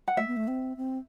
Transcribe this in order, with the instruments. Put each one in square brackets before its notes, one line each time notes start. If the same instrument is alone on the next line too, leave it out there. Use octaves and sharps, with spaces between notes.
[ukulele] F#5
[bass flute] A3 [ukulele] E5
[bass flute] B3
A3
C4
C4